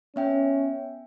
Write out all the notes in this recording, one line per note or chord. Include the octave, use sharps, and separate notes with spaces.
B3 C#4 E5 G5